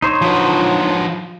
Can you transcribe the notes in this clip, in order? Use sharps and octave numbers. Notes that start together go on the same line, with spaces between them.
D#4 C5 C#5
F3 F#3 D4 F4 B4